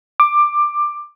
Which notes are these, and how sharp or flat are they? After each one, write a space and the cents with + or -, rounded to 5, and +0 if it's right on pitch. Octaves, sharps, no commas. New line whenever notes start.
D6 +15